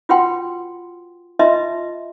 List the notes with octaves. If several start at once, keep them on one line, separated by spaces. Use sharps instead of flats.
F4 F#4 B4 F#5 G5 C6
F4 B4 D#5 E5 A5 C6